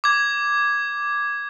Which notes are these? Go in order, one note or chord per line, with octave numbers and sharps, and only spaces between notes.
D6 G#6